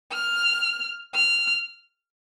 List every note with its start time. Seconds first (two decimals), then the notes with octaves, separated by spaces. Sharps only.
0.13 F6
1.15 F6